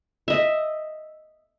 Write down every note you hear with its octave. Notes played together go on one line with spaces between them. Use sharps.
D#5 E5